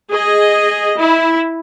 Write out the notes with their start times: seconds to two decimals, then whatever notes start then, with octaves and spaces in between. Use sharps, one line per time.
0.11 G#4 D#5
0.98 E4